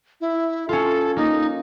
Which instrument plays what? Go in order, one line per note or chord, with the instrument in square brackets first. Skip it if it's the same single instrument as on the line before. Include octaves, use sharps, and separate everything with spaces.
[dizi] E4
[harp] C#4 F4 [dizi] A4
[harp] A#3 [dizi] D#4